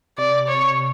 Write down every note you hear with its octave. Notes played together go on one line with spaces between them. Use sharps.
C3 D5
C#5